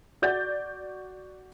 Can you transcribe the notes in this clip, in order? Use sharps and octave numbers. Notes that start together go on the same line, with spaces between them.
F#4 D5 G6 A6